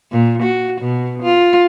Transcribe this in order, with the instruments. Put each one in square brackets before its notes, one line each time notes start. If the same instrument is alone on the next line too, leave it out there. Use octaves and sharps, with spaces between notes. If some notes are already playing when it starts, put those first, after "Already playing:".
[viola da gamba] A#2
F#4
B2
F4